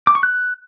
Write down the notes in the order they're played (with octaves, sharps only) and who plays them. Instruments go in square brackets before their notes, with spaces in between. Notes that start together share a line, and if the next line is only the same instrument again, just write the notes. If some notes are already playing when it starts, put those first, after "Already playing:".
[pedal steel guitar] D6
C#6
F#6